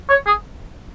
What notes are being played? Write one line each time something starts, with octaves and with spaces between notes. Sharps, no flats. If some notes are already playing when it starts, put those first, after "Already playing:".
C#5
G#4